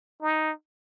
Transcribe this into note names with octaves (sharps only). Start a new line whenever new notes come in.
D#4